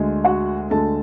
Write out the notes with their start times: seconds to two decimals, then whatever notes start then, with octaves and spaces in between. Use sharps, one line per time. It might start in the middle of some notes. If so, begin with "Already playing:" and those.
Already playing: D2 D3 G#3
0.24 F#4 F#5
0.70 D2 D3 G#3 A4 A5